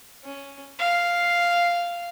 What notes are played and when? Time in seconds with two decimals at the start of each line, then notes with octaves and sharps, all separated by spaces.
0.24 C#4
0.79 F5